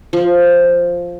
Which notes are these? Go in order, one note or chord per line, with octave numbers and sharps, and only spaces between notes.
F3